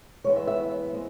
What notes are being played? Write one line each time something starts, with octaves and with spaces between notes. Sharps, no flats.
E3 G#3 B3 C#5
E5
E5
G#3 C4